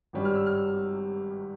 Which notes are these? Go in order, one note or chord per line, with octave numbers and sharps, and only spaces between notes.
G#1 G2 G3 C#4
F6
E6
F6